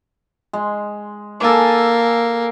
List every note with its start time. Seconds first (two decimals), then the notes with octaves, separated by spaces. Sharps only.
0.53 G#3
1.40 A#3 A4 G#5 D6